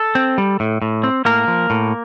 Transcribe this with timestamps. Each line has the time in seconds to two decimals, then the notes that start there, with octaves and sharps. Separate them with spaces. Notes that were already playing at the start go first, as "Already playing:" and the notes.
Already playing: A4
0.15 C4
0.38 G3
0.60 A2
0.82 A2
1.04 C4
1.25 A2 A#3 A#4
1.48 F3
1.70 A2